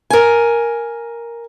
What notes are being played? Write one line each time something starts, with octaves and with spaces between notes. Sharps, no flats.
A#4 G#5